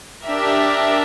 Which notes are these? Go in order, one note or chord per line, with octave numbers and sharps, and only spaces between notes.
D4 G4 A#4 E5